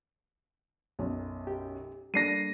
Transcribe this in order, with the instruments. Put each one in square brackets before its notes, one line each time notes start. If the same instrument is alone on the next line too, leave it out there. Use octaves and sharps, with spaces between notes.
[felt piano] B1 F#2
[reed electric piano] G4
[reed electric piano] G3 A#3 D4 [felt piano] A4 [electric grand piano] A#6 C7 D#7